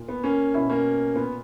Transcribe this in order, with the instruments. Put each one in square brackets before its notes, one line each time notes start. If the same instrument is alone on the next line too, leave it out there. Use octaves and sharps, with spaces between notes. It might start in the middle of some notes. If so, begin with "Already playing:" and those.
Already playing: [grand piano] A#2
B3
A#3 C#4
B2 C#4 E4
A#3 C#4
A#2 B3